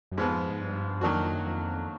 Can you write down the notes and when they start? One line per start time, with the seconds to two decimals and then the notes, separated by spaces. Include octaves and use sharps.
0.12 F#2
0.18 F2 G#2 F3 G#3 B3
0.50 G#2
0.60 G2
1.01 F2 D#3 F#3 A#3 D4 F#4
1.32 F#2
1.44 F2